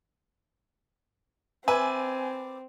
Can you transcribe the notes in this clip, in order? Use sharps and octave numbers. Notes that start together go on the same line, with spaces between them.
C4 B4 D5 E5 G#5